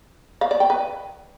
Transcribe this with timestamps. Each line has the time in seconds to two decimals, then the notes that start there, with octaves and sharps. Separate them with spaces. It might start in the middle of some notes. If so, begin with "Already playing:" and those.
0.41 F5
0.51 D5
0.60 G5
0.70 B4